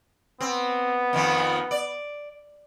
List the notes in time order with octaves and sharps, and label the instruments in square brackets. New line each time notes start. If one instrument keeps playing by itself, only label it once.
[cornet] B3 [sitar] C4
[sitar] F2 D#3 F3
D5